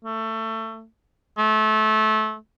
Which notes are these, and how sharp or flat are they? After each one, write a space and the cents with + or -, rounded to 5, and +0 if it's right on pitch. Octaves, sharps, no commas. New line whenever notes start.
A3 +20
A3 -25